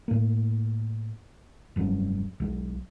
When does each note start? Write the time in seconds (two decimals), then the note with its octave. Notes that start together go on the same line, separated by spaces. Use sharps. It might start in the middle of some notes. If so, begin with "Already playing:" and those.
0.08 A2 A#3
1.76 F1 G2 F#3 C#4
2.40 B1 F#3 G#3